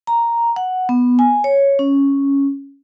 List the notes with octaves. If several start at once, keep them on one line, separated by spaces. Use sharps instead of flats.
A#5
F#5
B3
G#5
C#5
C#4